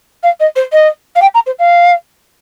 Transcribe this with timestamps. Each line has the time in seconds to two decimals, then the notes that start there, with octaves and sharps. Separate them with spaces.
0.23 F5
0.39 D#5
0.55 C5
0.72 D#5
1.15 F5
1.21 G5
1.34 A#5
1.46 C5
1.59 F5